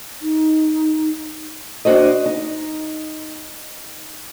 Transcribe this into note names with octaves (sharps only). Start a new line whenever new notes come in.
D#4
D4 D#4 F#4 C5 D#5
D#4